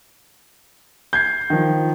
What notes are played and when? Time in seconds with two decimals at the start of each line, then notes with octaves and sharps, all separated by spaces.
1.13 G6 G#6 C7
1.50 D#3 F3